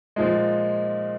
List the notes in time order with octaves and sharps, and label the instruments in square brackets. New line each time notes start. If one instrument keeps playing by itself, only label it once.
[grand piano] A#2 F3 G#3